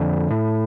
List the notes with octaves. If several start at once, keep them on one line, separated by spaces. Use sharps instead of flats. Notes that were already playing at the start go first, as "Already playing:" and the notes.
Already playing: F2 D3
A2